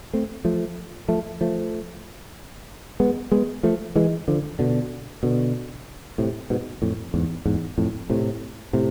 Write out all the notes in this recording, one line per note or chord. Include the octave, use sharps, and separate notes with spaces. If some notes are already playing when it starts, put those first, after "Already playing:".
A3 C4
F3 A3
F3 A3
F3 A3
G#3 B3
G#3 B3
F3 A3
E3 G#3
D3 F3
B2 D3
B2 D3
A2 C3
G#2 B2
F2 A2
E2 G#2
E2 G#2
F2 A2
A2 C3
A2 C3